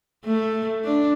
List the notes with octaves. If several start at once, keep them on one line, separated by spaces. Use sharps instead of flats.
A3
D4